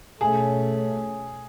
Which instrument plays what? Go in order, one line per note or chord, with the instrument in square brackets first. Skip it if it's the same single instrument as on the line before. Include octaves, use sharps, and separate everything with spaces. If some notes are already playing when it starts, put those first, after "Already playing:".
[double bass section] B2 A3 C#4 [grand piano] G#4